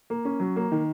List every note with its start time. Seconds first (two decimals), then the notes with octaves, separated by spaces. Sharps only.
0.10 A#3
0.25 C#4
0.40 F#3
0.56 A#3
0.72 D#3